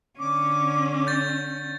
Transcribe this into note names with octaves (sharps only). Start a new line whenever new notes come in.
D3 C#4 D6
G6 A6